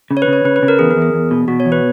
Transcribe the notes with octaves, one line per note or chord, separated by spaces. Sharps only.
C#3
C#5
B4
C#3
C#5
C#3 B4
B4
C#3
A#4
E2 G#4
A#4
E2
G#4
E2
B2
B2 F#4
C#5
E2
B4